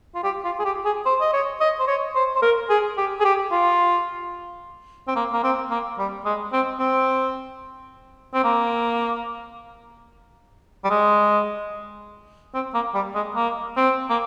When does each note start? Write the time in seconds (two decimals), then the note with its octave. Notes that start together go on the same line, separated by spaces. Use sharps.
0.15 F4
0.24 G4
0.44 F4
0.59 G#4
0.65 G4
0.85 G#4
1.06 C5
1.21 D#5
1.33 C#5
1.61 D#5
1.79 C5
1.87 C#5
2.15 C5
2.36 C5
2.42 A#4
2.70 G#4
2.97 G4
3.20 G#4
3.25 G4
3.51 F4
5.08 C4
5.16 A#3
5.32 A#3
5.43 C4
5.70 A#3
5.98 G3
6.25 G#3
6.52 C4
6.79 C4
8.34 C4
8.44 A#3
10.84 G3
10.90 G#3
12.54 C4
12.74 A#3
12.94 G3
13.15 G#3
13.35 A#3
13.77 C4
14.10 A#3